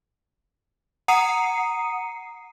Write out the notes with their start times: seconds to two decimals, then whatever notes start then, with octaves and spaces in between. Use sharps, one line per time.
1.08 F#5 A#5 D#6 C7 C#7 D#7